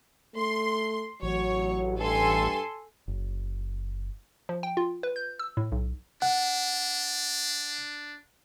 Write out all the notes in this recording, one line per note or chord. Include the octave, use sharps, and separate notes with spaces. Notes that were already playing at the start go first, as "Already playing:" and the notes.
A3 C6
A1 F#3 C#5
G2 A4 G#5 C6
F#1
F3
G5
F4
B4
G6
E6
A2
B1
D4 F#5